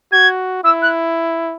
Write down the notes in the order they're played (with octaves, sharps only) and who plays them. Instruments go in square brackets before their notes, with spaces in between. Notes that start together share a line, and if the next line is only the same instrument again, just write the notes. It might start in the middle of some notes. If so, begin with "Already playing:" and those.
[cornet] F#4 [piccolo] G#6
[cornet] E4 [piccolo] E6
[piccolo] F#6